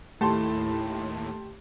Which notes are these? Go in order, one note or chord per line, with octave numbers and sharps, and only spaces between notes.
D#2 A2 A3 E4 G4 A5 C6